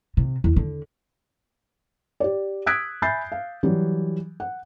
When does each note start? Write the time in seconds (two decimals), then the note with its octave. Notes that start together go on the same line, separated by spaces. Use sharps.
0.17 C3
0.44 E2
0.56 D3
2.20 G4 D5
2.66 D#6 E6 F#6 G#6 B6 D7
3.02 E5 G#5 B5 G6 A6 C7
3.32 F5
3.63 E3 F#3 G3
4.40 F#5